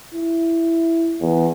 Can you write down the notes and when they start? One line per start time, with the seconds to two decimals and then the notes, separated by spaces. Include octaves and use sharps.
0.14 E4
1.21 E2